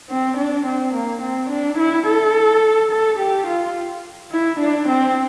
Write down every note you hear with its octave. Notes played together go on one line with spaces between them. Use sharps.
C4
D4
C4
A#3
C4
D4
E4
A4
A4
G4
F4
E4
D4
C4